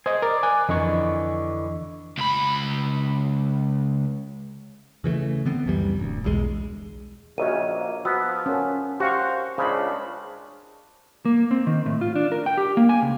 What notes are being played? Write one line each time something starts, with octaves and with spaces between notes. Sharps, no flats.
G#4 C5 D#5
A#4 D5
G#5 F#6
F2 D3 E3 D#5 C#6
C#2 B5
C#3 E3 G3 A3
D3 B3 C4
C#2 F#2 E3 G3
D1 D2
B1 E2 F3 G#3
A#1 C#3 F#4 A#4 C#5 D#5 E5 D#7
A#3
F3 B3 F#4 E6 F6 B6
C#4 A#4 F#5 A5
F#4 G4 C5 F5 C#6
C#2 C#3 D4 C5 B5
A#3
C4
D#3
A2
F4
D4
A#4
G5
G4
A#3
G#5
C#2